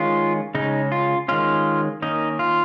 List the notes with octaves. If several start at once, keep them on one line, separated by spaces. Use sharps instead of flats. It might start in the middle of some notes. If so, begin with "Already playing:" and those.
Already playing: D#3 G#3 C#4 F4
C#3 G#3 C#4 D#4
F4
D#3 G#3 C#4 F4
D#3 A#3 C#4 D#4
F4